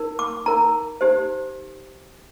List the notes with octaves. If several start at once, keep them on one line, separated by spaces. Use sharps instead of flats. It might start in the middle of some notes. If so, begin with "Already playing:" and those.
Already playing: D#4 A#4
D6
D#4 A#4 A#5
D#4 G4 C5